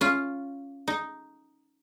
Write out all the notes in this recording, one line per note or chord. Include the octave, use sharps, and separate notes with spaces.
C#4 F4
D#4